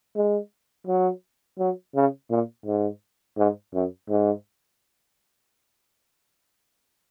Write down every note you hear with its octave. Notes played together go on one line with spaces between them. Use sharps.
G#3
F#3
F#3
C#3
A#2
G#2
G#2
F#2
G#2